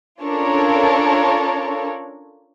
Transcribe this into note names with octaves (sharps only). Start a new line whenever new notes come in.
C#4 D4 F4 A4 A#4 C#5